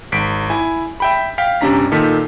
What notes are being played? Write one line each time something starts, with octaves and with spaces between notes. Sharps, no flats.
G#1 B6 C7 D7
E4 G#5
E5 G5 B5
F5 G5 B6
G1 C3 C#4 D4 A#5 B6
A#2 D#3 A4 B6